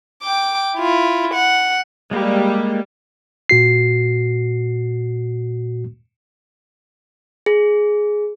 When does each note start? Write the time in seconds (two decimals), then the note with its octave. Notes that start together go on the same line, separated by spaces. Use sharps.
0.23 G5 D6
0.76 E4 F4
1.34 F#5
2.11 G3 G#3 A#3
3.49 A#2 F#4 C7
7.46 G#4